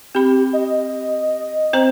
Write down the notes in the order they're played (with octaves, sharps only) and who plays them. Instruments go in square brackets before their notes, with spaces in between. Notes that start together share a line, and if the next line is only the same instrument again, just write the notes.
[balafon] C4 B5 [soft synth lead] G4
[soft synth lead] D#5
[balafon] C4 C5 A#5